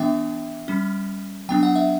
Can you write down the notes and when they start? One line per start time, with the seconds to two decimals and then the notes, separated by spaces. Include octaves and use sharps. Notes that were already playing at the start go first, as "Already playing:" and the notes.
Already playing: E3 B3 D4 E5 G5
0.68 G3 C#4
1.49 F#3 B3 D4 G5
1.63 F#5
1.76 E5